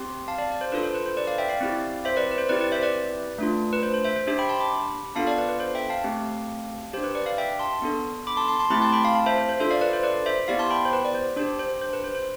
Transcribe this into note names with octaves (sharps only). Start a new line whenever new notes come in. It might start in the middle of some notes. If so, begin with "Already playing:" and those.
Already playing: C4 G4 C6
F5 A5
D5 F5
D5
C5
D4 F4 A4 B4
C5
B4
C5
B4 D5
D5 F5
E5 G5
D5 F5
C4 E4 G4
C5 E5
B4 D5
B4
C5
C4 E4 G4 B4 D5
B4 D5
C5 E5
B4 D5
A3 D4 F4
B4
C5
C5
C5 E5
C5
D4 G4 C5 E5
G5 B5
A5 C6
B5 D6
B3 D4 F4 A4 F5 A5
D5 F5
B4 D5
B4
C5
E5 G5
F5 A5
A3 C4 G4
D4 G4 C5
B4
B4 D5
D5 F5
E5 G5
A5 C6
B3 D4 A4
B5 D6
A5 C6
A5 C6
A5 C6
A3 C4 E4 G4 B5 D6
A5 C6
G5 B5
F5 A5
F5 A5
C5 E5
C5
C5
D4 F4 A4 C5 E5
D5 F5
B4 D5
C5
B4 D5
C5 E5
B3 E4 G4 D5 F5
A5 C6
G5 B5
C5
B4
D5
C5
D4 G4 C5
C5
C5
B4
C5
C5